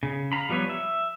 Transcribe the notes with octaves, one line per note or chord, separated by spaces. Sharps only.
C#3
F5 A#5 B5
F3 G3 B3 B4 C#5
E5